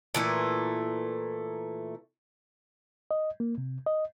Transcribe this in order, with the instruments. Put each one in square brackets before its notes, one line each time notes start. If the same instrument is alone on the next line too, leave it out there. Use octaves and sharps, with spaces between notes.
[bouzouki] A#2 E3 A3
[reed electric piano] D#5
A#3
C3
D#5